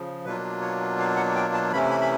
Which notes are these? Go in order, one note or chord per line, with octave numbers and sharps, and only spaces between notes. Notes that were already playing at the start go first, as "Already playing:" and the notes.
Already playing: C#3 F3
B2 F#3 A#3 D4 F4 B4
C#5
F5
F#5
G5
A5
C3 E3 A3 C#4 E4 B5
B5
B5